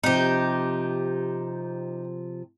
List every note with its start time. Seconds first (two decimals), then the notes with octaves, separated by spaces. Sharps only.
0.04 C3 F3 D#4 G4